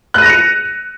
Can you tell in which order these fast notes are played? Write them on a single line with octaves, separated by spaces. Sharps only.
F#6 D#7 A#6 F7 C#7